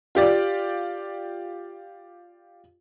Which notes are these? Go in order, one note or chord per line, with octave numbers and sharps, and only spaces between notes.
F4 G4 D5